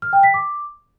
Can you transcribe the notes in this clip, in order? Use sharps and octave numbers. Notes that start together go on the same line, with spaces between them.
F6
G5
B6
D6